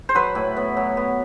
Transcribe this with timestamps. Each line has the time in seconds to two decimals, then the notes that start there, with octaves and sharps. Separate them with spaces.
0.09 C5
0.15 F#3 B4
0.35 A2
0.56 B3
0.77 F#3
0.97 B3